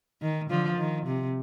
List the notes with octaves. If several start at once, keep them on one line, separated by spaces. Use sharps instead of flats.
D#3
D3 F3
D#3
C3